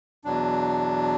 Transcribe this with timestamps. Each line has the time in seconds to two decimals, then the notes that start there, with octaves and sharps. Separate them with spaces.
0.25 E2 B2 F#3 D4